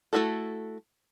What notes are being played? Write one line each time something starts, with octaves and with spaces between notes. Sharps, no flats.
A3 C#4 E4 F#4 A4